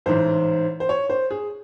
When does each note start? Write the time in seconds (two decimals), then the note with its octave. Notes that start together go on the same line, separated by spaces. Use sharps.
0.06 A1 G#2 E3 C5
0.80 C5
0.89 C#5
1.10 C5
1.31 G#4